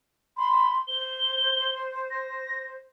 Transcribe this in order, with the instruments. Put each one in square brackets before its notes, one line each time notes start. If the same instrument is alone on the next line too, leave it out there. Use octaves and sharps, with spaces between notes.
[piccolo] B5 [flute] C6
[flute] C5 [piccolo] G7
[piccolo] A#6